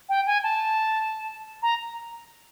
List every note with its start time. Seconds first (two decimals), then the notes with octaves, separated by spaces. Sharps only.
0.09 G5
0.26 G#5
0.43 A5
1.62 A#5